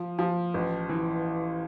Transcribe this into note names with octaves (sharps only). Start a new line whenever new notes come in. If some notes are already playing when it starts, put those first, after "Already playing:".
Already playing: F3
F3
A1
E3